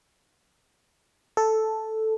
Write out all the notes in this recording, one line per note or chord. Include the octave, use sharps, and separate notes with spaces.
A4